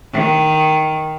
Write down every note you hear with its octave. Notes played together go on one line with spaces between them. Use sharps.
D#3